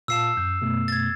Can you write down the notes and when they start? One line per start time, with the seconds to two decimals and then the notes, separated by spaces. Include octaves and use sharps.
0.08 A#2 F5 A5 E6 C7 E7
0.37 F#2 G6
0.61 F#2 B2 A3
0.88 G#6 A6